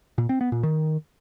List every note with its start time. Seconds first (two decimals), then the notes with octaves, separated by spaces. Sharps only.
0.18 A#2
0.29 C4
0.41 B3
0.52 A#2
0.63 D#3